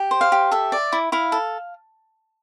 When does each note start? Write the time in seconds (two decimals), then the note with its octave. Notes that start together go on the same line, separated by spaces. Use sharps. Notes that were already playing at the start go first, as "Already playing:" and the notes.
Already playing: G4
0.11 C5
0.21 F5
0.32 G4
0.51 A4 E5
0.72 D5
0.92 E4
1.12 E4 F5
1.32 A4